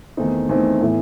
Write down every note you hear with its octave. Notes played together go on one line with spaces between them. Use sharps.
E2 D#3 A3 C4 D#4
E2 D#3 A3 C4 D#4
A2 E3 B3